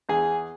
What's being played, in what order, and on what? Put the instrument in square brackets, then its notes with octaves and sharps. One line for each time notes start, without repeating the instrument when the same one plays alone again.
[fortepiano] E2 G#4